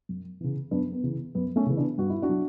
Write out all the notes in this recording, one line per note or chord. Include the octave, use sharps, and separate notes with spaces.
F#2
C#3 E3
F#2 B3 D4
B3
C#3 E3
F#2 B3
A3 C#4
C#3 E3
B3 D4
G2 F#4
E4
D4 F#4
F#3